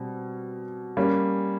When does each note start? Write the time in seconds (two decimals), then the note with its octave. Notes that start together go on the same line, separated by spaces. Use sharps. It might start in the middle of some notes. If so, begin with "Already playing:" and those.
Already playing: B2 G3 C4
0.97 G3 A#3 C#4